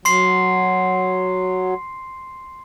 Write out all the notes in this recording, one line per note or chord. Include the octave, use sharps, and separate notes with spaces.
F#3 C6 C7